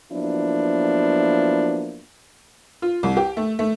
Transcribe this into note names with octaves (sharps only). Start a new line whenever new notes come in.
F3 F#3 A#3 B3 D4 E4
F4
C2
G4
A3
A3